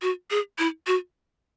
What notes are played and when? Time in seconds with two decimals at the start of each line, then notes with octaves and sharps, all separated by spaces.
0.02 F#4
0.31 G#4
0.59 E4
0.87 F#4